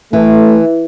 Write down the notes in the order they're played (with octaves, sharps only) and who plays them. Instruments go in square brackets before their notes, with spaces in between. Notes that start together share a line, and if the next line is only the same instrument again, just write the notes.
[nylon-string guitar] E3 [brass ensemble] A3